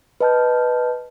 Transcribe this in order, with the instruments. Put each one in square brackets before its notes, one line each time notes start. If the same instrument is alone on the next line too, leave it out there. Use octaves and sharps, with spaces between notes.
[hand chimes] B4 D#5 A5 F6 G6